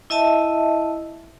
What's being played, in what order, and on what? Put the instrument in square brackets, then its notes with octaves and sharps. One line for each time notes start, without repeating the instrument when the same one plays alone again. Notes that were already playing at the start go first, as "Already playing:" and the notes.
[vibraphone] E4 D#5 E5 A5